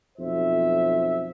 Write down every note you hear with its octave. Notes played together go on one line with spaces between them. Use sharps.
B1 F2 C5 E5